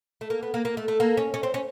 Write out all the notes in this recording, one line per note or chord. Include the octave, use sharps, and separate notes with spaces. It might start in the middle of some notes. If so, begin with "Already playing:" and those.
A3
A#3
B3
A#3
A#3
A3
A3
A#3
C#4
C#4
C4
C#4